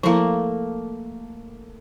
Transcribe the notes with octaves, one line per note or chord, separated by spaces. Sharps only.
F3 A3 A#3 E4 F5